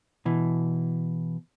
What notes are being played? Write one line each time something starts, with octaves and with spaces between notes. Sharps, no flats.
B2 E3